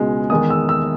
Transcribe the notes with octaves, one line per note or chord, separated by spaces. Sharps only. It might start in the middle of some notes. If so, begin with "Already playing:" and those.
Already playing: C#2 B2 G#3
E2 D#3 G#3 D#6
E6
E6